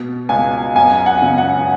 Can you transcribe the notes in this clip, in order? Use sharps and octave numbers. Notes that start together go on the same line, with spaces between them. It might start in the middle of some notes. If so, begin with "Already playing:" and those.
Already playing: B2
C#2 G#5
F#2 G#5
F#5
C#3
F#5